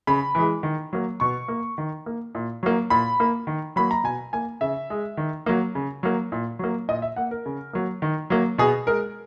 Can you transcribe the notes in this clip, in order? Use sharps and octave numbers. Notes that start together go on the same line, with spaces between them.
C#3 B5
E3 G#3
D#3
F#3 A#3
B2 C#6
A#3
D#3
A#3
A#2
F#3 A#3
A#2 B5
A#3
D#3
F#3 A#3 B5
A#5
B2 G#5
A#3 G#5
C#3 E5
G#3
D#3
F#3 A#3
C#3
F#3 A#3
A#2
F#3 A#3
A#2 D#5
E5
A#3 F#5
A#4
C#3
F#3 A#3
D#3
F#3 A#3
B2 G#4
G#3 A#4